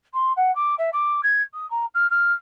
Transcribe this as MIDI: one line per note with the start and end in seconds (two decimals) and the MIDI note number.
0.14 0.32 84
0.36 0.53 78
0.55 0.75 86
0.78 0.90 76
0.93 1.21 86
1.23 1.42 92
1.54 1.69 87
1.70 1.85 82
1.94 2.09 89
2.10 2.33 89